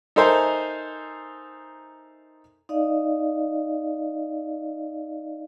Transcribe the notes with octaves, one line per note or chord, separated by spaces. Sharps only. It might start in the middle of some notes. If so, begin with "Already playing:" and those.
D#4 A4 A#4 C5 E5 G#5
D#4 D5 D#5 F5